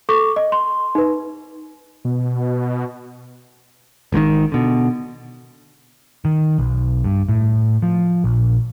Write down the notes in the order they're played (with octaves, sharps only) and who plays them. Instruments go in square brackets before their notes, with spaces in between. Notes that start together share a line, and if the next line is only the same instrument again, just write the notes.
[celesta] A4 C#6 D6
D#5
C6
D#4 B4
[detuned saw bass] B2
[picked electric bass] G#1 G#2 D3 D#3
B2 D3
D#3
B1
G2
A2
F3
A#1